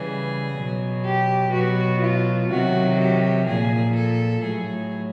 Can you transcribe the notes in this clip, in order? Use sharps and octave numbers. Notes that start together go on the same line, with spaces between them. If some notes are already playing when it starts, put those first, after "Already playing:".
Already playing: C#3 E3 G3 G#4
B2 F#3
G4
B2 F#3 F#4
F4
C3 D#3 F#3 F#4
G4
A#2 F3 G#4
A4
A2 F#3 G#4